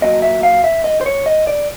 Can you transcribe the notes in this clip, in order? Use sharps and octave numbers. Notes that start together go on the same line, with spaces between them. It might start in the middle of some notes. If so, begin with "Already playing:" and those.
B1 A#2 F#3 D#5
E5
F5
E5
D#5
C5
C#5
D#5
D5